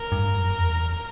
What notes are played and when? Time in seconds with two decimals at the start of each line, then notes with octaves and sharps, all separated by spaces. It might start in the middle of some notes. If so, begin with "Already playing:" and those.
Already playing: A#4
0.12 G2
0.35 F#2
0.58 E2